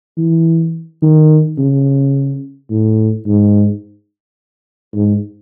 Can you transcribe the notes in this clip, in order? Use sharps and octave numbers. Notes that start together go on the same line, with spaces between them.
E3
D#3
C#3
A2
G#2
G#2